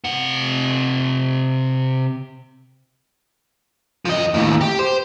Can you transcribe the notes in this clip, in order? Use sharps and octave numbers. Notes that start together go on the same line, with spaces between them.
C3 F#5
F3 D#5
D#2 A2
G4
C5